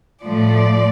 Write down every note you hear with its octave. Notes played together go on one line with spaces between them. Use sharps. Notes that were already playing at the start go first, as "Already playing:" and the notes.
A2 F3 A3 D5